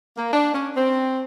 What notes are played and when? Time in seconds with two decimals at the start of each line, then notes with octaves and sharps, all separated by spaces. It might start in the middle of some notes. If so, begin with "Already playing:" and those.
0.16 A#3
0.32 D4
0.54 C#4
0.76 C4